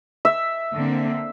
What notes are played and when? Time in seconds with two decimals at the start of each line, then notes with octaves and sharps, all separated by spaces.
0.25 E5
0.76 D3 A#3 C4